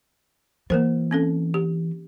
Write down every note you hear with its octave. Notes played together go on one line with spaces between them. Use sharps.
E3 A#3 A#4 C5
C4 C#4 A4
G4